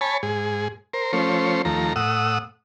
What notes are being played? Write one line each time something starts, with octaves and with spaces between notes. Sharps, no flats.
C#5 G#5 A5 B5
G#2 G#4
A#4 C5
F3 A3 C#4 C5
D#2 F3 A3 A#5
A2 F#5 D#6 E6